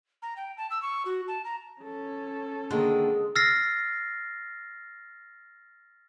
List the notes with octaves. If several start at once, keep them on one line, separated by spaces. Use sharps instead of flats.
A#5
G5
A5
E6
C#6
F#4
A5
A#5
C#4 A4
D3 D#3 G#3 A#3
E6 F6 A6 A#6 C7